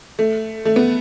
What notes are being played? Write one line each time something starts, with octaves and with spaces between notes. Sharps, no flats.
A3
A3
B3